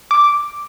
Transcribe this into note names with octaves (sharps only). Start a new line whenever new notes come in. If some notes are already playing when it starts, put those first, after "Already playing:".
D6